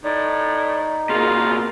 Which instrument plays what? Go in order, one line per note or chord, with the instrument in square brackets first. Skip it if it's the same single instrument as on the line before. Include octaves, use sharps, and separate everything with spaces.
[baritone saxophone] A2 [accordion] D#4 [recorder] D5
[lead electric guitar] B2 A#3 [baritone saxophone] F4 [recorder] G#4